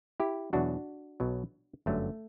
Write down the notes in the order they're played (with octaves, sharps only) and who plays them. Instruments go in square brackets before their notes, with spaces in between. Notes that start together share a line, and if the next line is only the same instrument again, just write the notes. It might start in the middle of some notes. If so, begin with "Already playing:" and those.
[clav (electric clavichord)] E4 G4
E2 B2 F#3 D4 F#4
B1 B2 F#3
G1 F#2 D3 F#3 A3